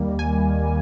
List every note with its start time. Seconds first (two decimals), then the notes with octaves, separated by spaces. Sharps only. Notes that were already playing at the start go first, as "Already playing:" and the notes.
Already playing: D#2 D#3 G3 A#3
0.19 G#5